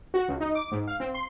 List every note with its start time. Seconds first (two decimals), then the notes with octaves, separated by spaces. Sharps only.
0.14 F#4
0.28 C#2
0.40 D#4
0.55 D6
0.72 G#2
0.87 F5
1.00 C4
1.14 C6